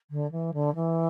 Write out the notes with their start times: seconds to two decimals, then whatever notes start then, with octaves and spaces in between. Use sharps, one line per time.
0.10 D3
0.31 E3
0.53 D3
0.75 E3